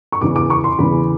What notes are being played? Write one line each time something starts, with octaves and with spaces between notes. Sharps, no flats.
C#6
E2 C#3 E3 D6
D6
C#6
C6
E2 C#3 E3 B5